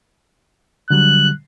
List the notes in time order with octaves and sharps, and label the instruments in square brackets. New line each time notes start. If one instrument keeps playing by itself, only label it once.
[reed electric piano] D3 F#3 G3 [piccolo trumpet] F#6